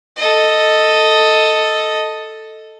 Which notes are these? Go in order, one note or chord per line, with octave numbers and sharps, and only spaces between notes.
A4 D#5